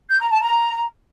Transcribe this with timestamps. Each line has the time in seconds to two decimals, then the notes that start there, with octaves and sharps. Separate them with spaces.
0.09 G6
0.20 A#5
0.30 A5
0.41 A#5